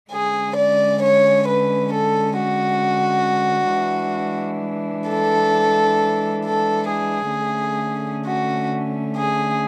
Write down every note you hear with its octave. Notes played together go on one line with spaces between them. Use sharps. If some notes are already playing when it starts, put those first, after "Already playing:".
D3 G#3 C#4 G#4
D5
C#5
B4
A4
F#4
E3 G#3 D4
A4
A4
G#4
D3 A3 C#4
F#4
G#4